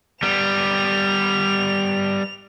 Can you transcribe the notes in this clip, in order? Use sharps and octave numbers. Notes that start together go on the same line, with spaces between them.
G3 B3 F7